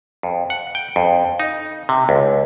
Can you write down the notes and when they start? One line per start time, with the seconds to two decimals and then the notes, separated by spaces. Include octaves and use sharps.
0.23 F2
0.50 F#5
0.75 G5
0.96 F2
1.40 D#4
1.89 C3
2.09 C#2